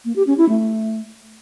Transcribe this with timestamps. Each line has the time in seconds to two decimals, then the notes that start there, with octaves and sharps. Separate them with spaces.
0.05 A#3
0.16 G4
0.27 C#4
0.38 E4
0.49 A3